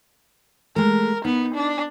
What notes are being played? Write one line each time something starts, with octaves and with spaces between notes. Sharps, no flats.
G#3 A3 A#4
B3 D#4
D4